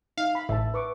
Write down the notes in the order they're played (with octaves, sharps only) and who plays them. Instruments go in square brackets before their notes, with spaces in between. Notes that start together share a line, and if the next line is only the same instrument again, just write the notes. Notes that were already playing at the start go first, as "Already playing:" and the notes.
[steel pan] D#4 E5 [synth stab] F5
[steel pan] B5
[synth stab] A1 [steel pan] E5 A5
[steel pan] B4 C#6 D6